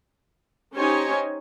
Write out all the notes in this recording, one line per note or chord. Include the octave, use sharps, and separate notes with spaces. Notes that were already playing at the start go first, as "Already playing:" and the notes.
C#4 D#4 G4 C5 C#5 G#5